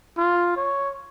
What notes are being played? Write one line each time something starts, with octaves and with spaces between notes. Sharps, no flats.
F4
C#5